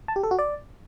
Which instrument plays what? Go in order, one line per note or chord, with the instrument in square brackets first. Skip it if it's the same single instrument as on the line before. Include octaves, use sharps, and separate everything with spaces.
[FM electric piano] A5
G4
A4
F#4
D5